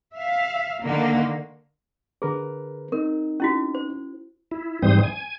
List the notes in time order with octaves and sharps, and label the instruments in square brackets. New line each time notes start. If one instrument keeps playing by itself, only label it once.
[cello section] E5 F5
D3 D#3 A#3
[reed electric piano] D3 A#4 B4 [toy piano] G#4
[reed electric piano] C4 D#4 [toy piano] A#4
[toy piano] C#4 E4 F#4
C5
[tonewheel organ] E4
G#2 E3 G3 C4 C5 D#6
G#5